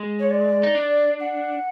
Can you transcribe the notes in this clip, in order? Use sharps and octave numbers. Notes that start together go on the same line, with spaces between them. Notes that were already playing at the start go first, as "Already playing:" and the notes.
Already playing: G#3
C#5
D5
D#4
D4
F#5